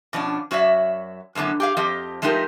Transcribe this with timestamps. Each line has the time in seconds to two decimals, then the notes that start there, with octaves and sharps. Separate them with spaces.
0.13 B2 F3 C#4 D4
0.51 F#2 F#4 C#5 D5 E5
1.35 F#2 A2 D3 B3 C#4
1.60 G4 G#4 F5
1.77 F2 F3 G4 D#5
2.22 F3 G#3 A3 D#4 G4 A#4